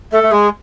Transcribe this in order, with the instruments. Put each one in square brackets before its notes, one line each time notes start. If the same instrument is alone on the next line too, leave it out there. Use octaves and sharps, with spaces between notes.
[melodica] A3 [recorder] A4
[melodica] A3
[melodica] G#3 [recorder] G#4